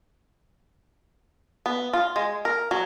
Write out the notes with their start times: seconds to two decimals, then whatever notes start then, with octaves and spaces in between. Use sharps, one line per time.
1.66 B3
1.93 F4
2.16 G#3
2.45 A#4
2.71 F#3